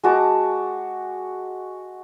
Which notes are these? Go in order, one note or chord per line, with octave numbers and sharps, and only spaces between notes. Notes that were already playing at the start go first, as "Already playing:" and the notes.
G#3 F#4 A5 D6